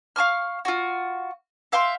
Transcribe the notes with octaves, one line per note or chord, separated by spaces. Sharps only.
F5 A5 C#6 F6
F4 F#4
E5 F5 G5 C6